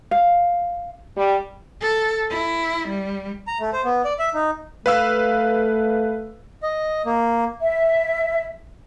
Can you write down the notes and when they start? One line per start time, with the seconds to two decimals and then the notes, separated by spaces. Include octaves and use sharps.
0.11 F5
1.17 G3
1.81 A4
2.30 E4
2.88 G3
3.47 A#5
3.60 A3
3.73 C5
3.84 B3
4.05 D5
4.19 E5
4.34 D#4
4.86 A3 B4 F5 E6
6.63 D#5
7.06 A#3
7.61 E5